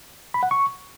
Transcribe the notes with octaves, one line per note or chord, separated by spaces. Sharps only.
B5
F#5
C#6